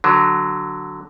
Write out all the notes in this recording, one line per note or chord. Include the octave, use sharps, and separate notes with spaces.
D3 F#3